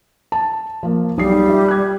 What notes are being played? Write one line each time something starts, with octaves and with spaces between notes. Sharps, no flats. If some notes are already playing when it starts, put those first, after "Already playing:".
A5
F3 A#3
B1 G3 D#6 C7
F4 E5
F#6 G#6